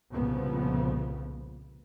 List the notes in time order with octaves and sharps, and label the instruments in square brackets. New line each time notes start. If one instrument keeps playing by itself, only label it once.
[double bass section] C2 F2 A#2 C#3 F3 B3